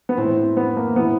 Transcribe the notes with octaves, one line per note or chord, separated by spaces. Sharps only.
B3
A2 E3 C4
C4
B3
A#3
A2 E3 B3